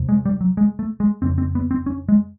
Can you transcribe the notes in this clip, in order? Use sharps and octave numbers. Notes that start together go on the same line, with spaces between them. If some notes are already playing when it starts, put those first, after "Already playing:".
Already playing: E2 C3
G#3
G3
F#3
G#3
A3
G#3
F2 C#3 C4
C4
B3
C4
C#4
G#3